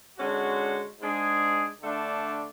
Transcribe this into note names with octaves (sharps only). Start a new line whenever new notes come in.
D3 G#3 C#4 F#4
G#2 G#3 D4 G#4
D3 A3 D4